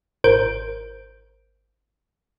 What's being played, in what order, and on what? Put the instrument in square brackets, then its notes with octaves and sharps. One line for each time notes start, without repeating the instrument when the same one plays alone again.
[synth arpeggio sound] G#1 A#4 C5 G6 D7